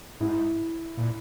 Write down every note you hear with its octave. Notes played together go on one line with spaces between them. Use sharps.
G#2 E4
A#2